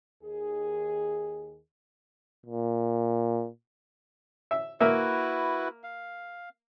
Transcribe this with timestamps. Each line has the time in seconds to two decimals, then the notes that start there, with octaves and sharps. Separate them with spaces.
0.23 D#2 D#3 G#4
2.46 A#2
4.51 E5
4.80 A#3 E4 F#4 A#4 B4 E5
5.84 F5